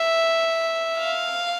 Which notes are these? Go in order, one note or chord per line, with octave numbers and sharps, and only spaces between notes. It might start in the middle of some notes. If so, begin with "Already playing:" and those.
Already playing: E5
F5